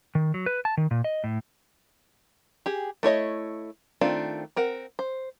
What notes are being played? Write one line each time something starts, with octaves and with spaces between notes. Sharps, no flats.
D#3
F#3
B4
A5
D#3
A#2
D#5
A2
G4 G#4
A3 E4 C#5 D#5
D#3 A3 C4 D4 F4
C4 A#4 F#5
C5